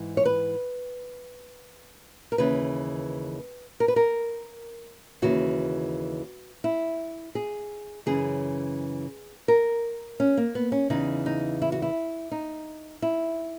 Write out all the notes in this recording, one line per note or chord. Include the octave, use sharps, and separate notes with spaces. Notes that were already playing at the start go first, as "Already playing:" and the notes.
Already playing: G#2 E3
C#5
B4
A#4
D#2 C#3 E3 B4
A#4
B4
A#4
D#2 C#3 E3 F#4
E4
G#4
F#2 C#3 E3 G#4
A#4
C#4
A#3
B3
C#4
E2 C#3 E3 D#4
D#4
E4
F#4
E4
D#4
E4